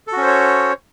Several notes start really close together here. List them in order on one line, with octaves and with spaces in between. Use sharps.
A4 F#4 C#4 C5 C#5